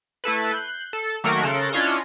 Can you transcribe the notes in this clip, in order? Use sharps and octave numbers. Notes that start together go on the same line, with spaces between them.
A3 E4 A4 B4
F#6 G6 C7
A4
D#3 F#3 A3 A#3 F#4 A#4
C#3 A4 A#4 C6 F#6
C#4 D4 E4 F4 C#5 D#5